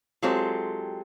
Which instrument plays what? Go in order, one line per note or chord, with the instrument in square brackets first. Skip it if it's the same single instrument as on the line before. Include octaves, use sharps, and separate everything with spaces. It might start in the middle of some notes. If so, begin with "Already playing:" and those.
[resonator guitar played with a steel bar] F#3 G#3 C4 F4 G4 A4